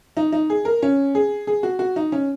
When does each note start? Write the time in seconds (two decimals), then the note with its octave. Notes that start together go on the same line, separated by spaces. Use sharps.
0.17 D#4
0.32 D#4
0.50 G#4
0.65 A#4
0.82 C#4
1.15 G#4
1.47 G#4
1.63 F#4
1.79 F#4
1.96 D#4
2.12 C#4